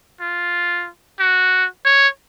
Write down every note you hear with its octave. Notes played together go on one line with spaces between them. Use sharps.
F4
F#4
C#5